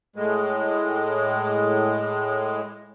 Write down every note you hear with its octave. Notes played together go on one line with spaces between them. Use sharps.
A2 G#3